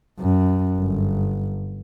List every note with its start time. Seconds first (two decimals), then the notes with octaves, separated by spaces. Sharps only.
0.20 F#2
0.79 G1